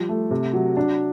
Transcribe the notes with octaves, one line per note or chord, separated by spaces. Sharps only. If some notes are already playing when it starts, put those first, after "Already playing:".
Already playing: F3 G3
A3
C3
F#3
D4